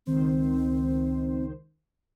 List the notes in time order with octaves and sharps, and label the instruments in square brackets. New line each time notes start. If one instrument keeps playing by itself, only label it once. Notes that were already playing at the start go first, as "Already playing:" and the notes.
[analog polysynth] C#2 D#3 C5 [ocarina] C4